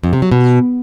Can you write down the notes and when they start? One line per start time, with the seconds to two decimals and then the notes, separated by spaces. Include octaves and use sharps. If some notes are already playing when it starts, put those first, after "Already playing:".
0.03 F2
0.13 C3
0.22 F#3
0.32 B2